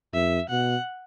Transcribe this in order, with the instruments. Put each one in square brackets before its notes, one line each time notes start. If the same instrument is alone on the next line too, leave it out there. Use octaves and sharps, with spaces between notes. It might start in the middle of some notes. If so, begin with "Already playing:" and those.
[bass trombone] F2 [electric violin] E5
[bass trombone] B2 [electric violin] F#5